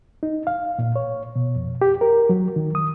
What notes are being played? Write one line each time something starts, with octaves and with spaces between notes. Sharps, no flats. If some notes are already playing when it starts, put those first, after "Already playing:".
D#4
F5
A#2
C#5
B2
F2
G4
A#4
F#3
D#3
D#6